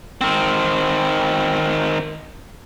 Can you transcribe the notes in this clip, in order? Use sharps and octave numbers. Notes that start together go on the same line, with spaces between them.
D#3 C4